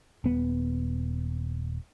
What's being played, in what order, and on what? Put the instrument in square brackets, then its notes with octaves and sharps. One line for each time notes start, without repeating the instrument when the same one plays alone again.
[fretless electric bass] D#1 B3